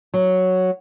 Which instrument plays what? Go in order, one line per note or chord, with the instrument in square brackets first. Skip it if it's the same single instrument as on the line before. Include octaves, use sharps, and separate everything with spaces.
[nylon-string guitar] F#3